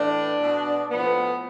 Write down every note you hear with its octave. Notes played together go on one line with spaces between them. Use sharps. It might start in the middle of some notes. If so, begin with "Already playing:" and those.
Already playing: A2 E3 D4
B2
A2 F3 B3